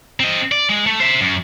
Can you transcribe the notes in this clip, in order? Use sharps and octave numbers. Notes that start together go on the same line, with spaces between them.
C4 D#5
D5
G#3
A3
C5 E5
F#2